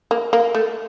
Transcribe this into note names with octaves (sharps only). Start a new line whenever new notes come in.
A#3
A#3
A3